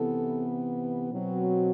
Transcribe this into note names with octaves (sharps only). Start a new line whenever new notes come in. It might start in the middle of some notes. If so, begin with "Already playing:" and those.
Already playing: C3 E3 B3 A4
B2 F#3 C4